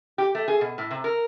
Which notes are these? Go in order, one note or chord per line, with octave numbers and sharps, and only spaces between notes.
G4
A3
G#4
B2
A2
C3
A#4